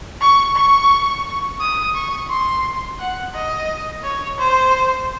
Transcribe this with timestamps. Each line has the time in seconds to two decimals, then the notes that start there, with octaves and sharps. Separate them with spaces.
0.21 C#6
0.56 C#6
1.60 D#6
1.95 C#6
2.29 C6
2.99 F#5
3.34 D#5
4.03 C#5
4.38 C5